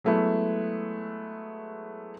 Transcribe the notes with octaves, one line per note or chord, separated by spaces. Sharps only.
F#3 G#3 A3 B3 E4